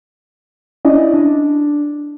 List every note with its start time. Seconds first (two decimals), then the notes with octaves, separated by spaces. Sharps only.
0.85 C#4 D4 E4 D5 D#5
1.14 D4